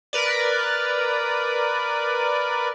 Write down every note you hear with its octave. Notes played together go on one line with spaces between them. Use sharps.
A#4 B4 D5